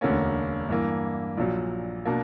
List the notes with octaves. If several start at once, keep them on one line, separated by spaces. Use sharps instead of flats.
E1 D2 D3 A#3 C#4
G2 E3 A#3
A#1 A#2 F#3
B2 A#3 D4